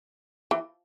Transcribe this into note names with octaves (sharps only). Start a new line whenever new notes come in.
E3